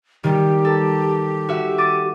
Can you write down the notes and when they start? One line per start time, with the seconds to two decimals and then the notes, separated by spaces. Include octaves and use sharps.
0.24 D#3 G3 G4
0.65 A4
1.49 F#4 E5
1.78 D6 A6 D#7